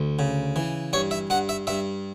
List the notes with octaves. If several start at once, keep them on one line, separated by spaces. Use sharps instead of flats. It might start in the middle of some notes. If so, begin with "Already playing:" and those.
Already playing: D2
C#3
E3
G2 C#5
E5
G2 F#5
E5
G2 E5